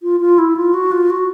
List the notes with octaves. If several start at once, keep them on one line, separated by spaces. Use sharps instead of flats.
F4
F4
E4
F4
F#4
F4
F#4